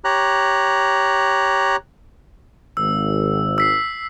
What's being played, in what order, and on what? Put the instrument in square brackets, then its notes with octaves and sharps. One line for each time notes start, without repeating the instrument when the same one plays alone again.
[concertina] G4 C#5 A#5 F#6
[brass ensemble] G#1 [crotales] E6
[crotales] E6 B6 C7